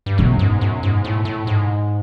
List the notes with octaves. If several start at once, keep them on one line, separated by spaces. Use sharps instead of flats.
G2
F#2 B2
G#2
F#2
G#2
A2
A2
G#2